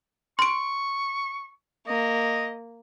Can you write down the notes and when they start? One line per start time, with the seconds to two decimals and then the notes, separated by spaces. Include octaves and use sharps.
0.39 C6 C#6 D7
1.88 A#3 D#5